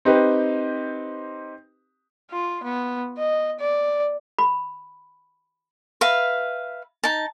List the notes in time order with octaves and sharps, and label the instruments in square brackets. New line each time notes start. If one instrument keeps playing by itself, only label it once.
[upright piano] C4 D#4 G4 B4
[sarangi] F4
B3
D#5
D5
[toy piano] B5
[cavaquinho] B4 E5 F5
D#4 A5